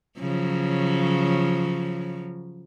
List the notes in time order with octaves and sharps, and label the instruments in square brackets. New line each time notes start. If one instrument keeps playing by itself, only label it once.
[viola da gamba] C#3 F3 F#3